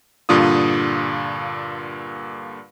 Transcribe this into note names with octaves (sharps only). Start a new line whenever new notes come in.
G2 A#2 D3 F4 D#6